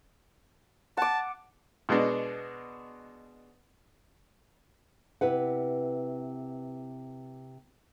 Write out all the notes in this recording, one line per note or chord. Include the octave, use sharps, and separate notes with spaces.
F#5 A5 D6
B2 G#3 B3 D4
C3 E4 B4 F#5